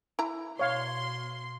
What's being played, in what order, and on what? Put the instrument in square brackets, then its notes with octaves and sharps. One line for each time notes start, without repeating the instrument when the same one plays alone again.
[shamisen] E4 A#5
[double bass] B2 [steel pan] C#5 F5 [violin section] C6